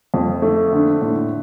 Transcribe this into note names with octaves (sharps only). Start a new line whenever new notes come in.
F2
A3
D3
A2